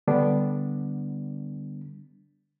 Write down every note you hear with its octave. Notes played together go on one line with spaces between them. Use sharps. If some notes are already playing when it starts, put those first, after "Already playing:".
D3 G3 B3 D4